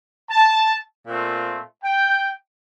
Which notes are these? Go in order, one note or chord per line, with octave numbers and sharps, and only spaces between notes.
A5
A#2 A3 C4 F4
G5